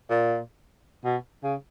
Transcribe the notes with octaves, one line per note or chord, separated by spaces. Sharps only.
A#2
B2
C#3